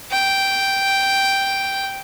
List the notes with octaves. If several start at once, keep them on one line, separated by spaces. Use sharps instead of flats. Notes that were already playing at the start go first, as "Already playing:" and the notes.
G5